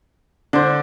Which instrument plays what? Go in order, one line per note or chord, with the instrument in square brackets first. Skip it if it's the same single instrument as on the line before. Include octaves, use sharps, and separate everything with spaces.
[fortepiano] D3 [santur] D4 C5